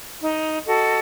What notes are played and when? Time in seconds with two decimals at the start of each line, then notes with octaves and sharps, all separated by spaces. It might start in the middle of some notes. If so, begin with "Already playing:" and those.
0.20 D#4
0.67 F#4 A4 D#5